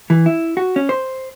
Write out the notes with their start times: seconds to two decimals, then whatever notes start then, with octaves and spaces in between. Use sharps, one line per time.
0.10 E3
0.26 E4
0.57 F#4
0.76 C#4
0.89 C5